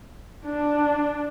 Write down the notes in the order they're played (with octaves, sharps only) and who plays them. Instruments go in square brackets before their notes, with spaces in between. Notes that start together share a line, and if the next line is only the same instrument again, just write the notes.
[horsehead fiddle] D4